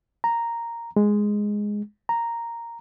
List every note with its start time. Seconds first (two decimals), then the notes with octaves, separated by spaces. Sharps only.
0.24 A#5
0.96 G#3
2.09 A#5